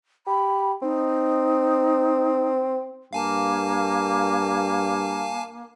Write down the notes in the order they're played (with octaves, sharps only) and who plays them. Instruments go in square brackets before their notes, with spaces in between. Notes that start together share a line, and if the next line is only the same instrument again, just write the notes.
[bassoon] G4 [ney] B5
[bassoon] C4 [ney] D#4
[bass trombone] G2 [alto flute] A#3 [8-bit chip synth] F5 G#5 A5